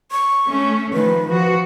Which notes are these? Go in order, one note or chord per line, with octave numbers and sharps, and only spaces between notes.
C#6
A3 C#4
D#3 F3 B4
F3 F#4